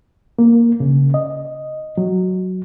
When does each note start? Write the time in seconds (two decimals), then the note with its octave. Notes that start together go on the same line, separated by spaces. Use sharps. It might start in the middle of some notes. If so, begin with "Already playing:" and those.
0.39 A#3
0.80 C#3
1.14 D#5
1.98 F#3